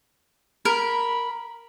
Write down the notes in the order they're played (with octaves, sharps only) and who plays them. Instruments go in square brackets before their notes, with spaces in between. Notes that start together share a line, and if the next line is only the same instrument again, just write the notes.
[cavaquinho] A#4 [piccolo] B5